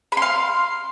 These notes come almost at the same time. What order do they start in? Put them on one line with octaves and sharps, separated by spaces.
B5 C6 F5